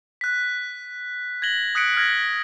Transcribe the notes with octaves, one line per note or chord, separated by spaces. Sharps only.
F#6 B6
G#6 A#6 F#7 G7
D#6 F#6 B6 C#7 D7
F6 G#6 A#6